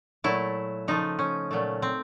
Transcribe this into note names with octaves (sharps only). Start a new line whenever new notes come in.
A#2 F#3 A3 E4
C#3 F3 A3 D#4
C#4
A#2 F#3 A3
C4